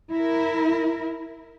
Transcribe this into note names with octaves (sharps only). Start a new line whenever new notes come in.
E4 A#4